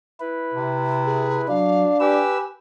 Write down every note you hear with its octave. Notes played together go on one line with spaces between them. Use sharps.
E4 B4
C3
G#4
F#3 D4 F5
G4 B4 G#5 E6